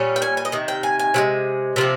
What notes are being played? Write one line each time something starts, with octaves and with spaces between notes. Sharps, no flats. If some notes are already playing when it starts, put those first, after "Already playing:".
Already playing: A#2 G3 C#4
G5
G#5
G#5
D#5
C3 D#3
G5
G#5
G#5
C3 F3 G#3
C3 F3 C4